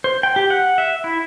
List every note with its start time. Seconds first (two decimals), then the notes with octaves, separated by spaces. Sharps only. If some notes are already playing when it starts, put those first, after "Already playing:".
0.04 C5
0.23 G5
0.36 G4
0.50 F#5
0.78 E5
1.04 E4